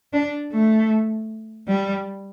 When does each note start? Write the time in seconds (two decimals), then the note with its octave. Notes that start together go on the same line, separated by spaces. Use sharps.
0.13 D4
0.52 A3
1.67 G3